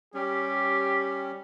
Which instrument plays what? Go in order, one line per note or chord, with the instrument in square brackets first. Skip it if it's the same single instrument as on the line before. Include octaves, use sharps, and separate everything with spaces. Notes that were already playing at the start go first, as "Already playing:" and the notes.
[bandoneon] G3 C#4 [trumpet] G4